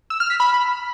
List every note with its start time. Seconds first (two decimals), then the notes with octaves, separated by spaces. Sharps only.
0.10 E6
0.20 F6
0.30 B6
0.40 B5